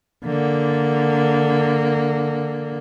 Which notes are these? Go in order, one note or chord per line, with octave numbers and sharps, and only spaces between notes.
D3 A#3